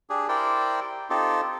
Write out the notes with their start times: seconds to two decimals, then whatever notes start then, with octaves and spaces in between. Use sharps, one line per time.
0.10 D4 G4 G#4
0.28 E4 G4 A#4 C5 D5 G5
1.10 C4 D#4 F4 G4 A4